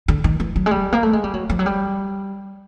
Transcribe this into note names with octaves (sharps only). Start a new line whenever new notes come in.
D3
D#3
E3
F#3
G#3
G3
A#3
A3
G#3
G3
F#3
F3
F#3
G3